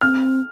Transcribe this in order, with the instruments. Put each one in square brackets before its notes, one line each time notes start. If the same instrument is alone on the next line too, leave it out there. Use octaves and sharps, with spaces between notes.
[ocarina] C4 [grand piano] F6